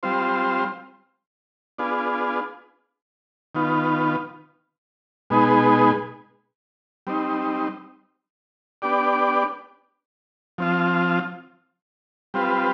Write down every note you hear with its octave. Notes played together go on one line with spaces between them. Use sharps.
G3 C4 F4 C5
B3 D4 F4 G#4
D#3 B3 F4
B2 G#3 B3 D#4 G#4
G3 C4 D#4
B3 D4 G4 D5
F3 C4 F4
G3 C4 F4 B4